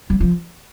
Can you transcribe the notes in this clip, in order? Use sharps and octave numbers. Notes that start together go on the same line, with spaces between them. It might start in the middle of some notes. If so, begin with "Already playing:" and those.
F#3
F3